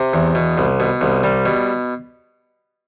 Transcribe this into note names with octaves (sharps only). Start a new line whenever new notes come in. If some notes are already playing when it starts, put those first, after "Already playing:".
Already playing: C3
E2
B2
C2
B2
C2
G3
B2